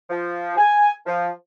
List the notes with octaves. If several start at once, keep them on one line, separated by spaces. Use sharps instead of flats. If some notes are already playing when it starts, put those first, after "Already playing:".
F3
G#5
F3